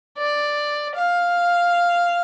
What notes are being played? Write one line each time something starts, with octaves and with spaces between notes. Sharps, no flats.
D5
F5